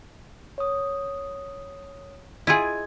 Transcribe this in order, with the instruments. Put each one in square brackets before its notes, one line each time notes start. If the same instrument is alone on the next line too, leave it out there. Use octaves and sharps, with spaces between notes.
[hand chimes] C#5 D#6
[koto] E4 F4 G#4 [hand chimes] D#5 G#6